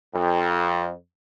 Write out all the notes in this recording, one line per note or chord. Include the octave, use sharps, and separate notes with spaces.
F2